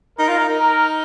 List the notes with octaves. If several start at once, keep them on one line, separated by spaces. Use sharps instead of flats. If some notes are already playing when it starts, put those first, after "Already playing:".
D#4 A#4
F4
D#4
D#4
A#4